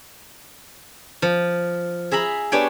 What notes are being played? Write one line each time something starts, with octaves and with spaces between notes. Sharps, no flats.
F3
G#4 E5 A#5 B5
B3 D4 G4 C#5 G5 G#5